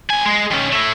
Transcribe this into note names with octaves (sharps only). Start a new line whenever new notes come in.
A2 G#5
G#3
D#3 C#4
A3 E4